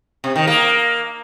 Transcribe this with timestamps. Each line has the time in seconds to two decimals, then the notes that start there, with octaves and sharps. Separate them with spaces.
0.24 C3
0.36 D#3
0.47 A#3